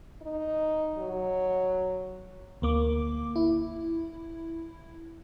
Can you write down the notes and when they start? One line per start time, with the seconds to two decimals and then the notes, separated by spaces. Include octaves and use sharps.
0.22 D#4
0.98 F#3
2.62 D2 A#3 D6
3.36 E4